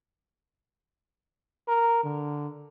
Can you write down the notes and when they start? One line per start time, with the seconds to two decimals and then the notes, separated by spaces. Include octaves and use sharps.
1.68 A#4
2.04 D3